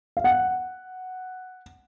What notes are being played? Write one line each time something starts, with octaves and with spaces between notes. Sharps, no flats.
F5
F#5